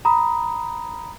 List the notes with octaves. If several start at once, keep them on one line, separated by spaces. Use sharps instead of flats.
A#5 B5 D#6